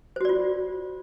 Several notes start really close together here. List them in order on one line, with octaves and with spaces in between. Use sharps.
C5 F#4 D5 F4